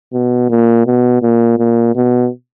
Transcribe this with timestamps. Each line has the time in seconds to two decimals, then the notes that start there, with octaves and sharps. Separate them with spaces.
0.13 B2
0.49 A#2
0.86 B2
1.22 A#2
1.58 A#2
1.95 B2